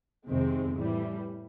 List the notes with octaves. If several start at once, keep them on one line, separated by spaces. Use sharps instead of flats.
F2 C3 D#3 G#3 C4
A2 E3 G3